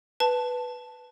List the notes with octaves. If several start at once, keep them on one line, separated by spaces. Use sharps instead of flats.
B4 A5